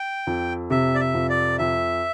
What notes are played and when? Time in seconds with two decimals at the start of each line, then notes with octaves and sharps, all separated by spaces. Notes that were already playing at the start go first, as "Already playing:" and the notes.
Already playing: G5
0.27 F2
0.70 C3 E5
0.95 D5
1.00 E5
1.14 F2
1.29 D5
1.58 F2 E5